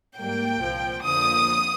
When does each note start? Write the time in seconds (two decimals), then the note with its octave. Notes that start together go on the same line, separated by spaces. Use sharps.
0.16 G#2 G3 A#3 G5
0.61 C2 A#2 F3
1.04 F2 D3 F3 A#3 D#6